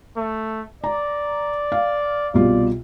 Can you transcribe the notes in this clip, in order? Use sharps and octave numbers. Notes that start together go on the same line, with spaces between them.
A3
D5 A#5
F5
C2 B2 F4 D5